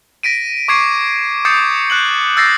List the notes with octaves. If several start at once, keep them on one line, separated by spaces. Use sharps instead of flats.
A#6 B6 D7 D#7
C#6 D6 G#6 C7 D7 D#7
D6 D#6 G6 A6 C7 C#7
F#6 G6 F#7
E6 G6 A6 A#6 C7